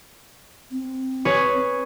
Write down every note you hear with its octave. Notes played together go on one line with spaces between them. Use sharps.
C4
G#4 B4 C#5